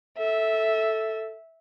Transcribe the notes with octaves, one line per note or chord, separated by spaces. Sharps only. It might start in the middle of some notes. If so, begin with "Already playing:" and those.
A4 E5